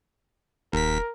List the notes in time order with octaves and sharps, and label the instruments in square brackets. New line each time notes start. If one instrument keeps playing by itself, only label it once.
[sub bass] E1 [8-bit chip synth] D#2 B6 [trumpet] A#4